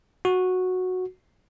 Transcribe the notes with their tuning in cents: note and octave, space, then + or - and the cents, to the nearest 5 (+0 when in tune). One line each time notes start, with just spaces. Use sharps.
F#4 -10